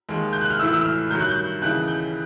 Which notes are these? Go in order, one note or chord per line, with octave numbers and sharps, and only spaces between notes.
D#2 D#3 G#3
G6
F#6
F6
A2 E3 A3 E6
E6
F6
G2 D#3 F#3 G6
F#6
G6
D#2 C#3 E3 F#6
G6